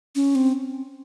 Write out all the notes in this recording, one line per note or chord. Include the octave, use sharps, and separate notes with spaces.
C#4
C4